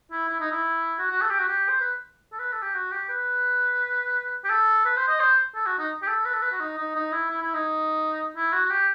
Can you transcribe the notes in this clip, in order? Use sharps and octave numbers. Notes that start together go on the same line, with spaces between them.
E4
E4
D#4
E4
F#4
F#4
A4
G4
F#4
G4
C5
B4
A4
B4
A4
G4
F#4
G4
B4
G4
A4
B4
C5
D#5
C5
A4
F#4
D#4
G4
A4
B4
A4
B4
F#4
D#4
D#4
D#4
E4
E4
E4
D#4
E4
F#4
F#4
G4